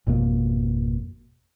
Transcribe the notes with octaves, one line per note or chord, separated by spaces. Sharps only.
G#1 F2 B2 A#3